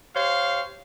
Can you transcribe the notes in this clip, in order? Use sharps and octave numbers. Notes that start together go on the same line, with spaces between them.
G4 C5 C#5 F5